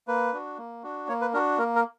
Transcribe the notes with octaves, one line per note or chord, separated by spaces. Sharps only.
A#3 B4
D4 F#4
A#3
D4 F#4
A#3 C#5
B4
D4 F#4 A#4
A#3 A#4
A#4